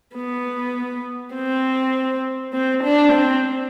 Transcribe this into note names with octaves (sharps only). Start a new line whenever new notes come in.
B3
C4
C4
D4
C4